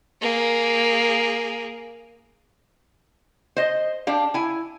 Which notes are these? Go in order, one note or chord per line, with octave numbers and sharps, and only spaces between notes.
A#3 G#4
C5 D#5
D4 G4 F5
E4 G#5